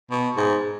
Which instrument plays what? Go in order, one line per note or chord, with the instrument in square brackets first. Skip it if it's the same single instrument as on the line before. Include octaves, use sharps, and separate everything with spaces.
[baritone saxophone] B2
G#2